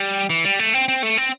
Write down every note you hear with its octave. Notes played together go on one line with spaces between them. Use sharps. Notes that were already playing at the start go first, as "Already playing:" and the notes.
Already playing: G3
E3
G3
A3
C4
C4
A3
C4